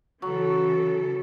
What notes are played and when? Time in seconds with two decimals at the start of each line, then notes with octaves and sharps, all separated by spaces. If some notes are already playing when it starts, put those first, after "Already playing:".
0.22 C#3 E3 F#3 A4